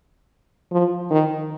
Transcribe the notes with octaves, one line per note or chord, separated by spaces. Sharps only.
F3
D#3